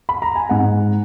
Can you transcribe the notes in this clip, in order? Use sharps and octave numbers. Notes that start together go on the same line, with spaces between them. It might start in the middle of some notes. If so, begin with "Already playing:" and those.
B5
A#5
G#5
G#2 F#5